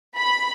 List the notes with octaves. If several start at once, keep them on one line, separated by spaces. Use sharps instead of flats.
B5